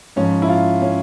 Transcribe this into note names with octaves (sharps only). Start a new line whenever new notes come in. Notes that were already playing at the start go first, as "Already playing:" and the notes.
G#2 F3 C#4
E4
F4
C#4